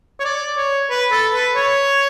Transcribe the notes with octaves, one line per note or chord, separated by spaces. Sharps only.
C#5
D5
C#5
B4
A4
B4
C#5